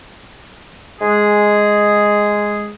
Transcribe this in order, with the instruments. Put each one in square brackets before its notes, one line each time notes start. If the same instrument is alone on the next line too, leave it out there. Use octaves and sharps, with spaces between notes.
[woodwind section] G#3 G#4